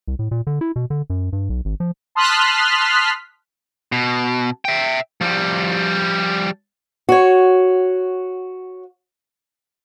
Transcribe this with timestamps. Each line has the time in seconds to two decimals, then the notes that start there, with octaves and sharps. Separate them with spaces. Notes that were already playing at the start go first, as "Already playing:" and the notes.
0.08 C2
0.19 A2
0.31 A#2
0.47 D3
0.61 E4
0.76 B2
0.90 D3
1.10 F#2
1.33 G2
1.50 B1
1.65 G#1
1.80 F3
2.15 A5 C6 D#6 F6 F#6 B6
3.92 B2
4.65 E5 G5
5.21 F3 G3
7.09 F#4 C#5